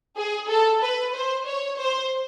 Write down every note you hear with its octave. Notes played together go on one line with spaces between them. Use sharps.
G#4
A4
B4
C5
C#5
C5